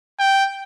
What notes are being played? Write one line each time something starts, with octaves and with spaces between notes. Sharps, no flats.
G5